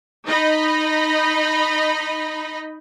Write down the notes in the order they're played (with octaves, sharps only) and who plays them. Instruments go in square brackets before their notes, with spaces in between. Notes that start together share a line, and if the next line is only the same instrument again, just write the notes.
[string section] D#4 D#5 B5